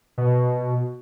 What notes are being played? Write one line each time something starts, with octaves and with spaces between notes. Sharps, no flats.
B2